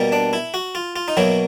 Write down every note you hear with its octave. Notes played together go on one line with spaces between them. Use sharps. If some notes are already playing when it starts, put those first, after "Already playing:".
Already playing: B2 G3 A#3
D4
E4
F#4
F4
F4
D#4
B2 F#3 A#3 E4